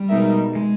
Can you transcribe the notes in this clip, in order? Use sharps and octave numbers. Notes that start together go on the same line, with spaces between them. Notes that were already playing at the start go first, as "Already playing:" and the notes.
Already playing: G3
B2 G#3 D#4 A#4 E5
G#3